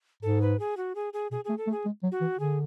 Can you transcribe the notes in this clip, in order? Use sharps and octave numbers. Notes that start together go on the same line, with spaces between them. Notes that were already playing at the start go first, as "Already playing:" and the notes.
G#2 A4
B4
G#4
F#4
G#4
G#4
B2 G#4
A3 G#4
A4
A3
G#4
G#3
F#3
F#4
E3
D3 G#4